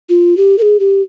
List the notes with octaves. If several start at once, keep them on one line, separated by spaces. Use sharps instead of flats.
F4
G4
A#4
G#4
G4